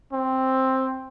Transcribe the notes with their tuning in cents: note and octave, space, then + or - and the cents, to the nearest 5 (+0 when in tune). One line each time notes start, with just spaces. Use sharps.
C4 +5